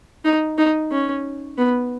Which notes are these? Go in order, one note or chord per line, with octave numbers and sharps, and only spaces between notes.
D#4
D#4
C#4
B3